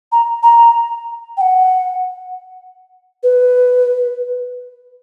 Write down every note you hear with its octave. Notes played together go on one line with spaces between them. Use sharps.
A#5
A#5
G5
F#5
B4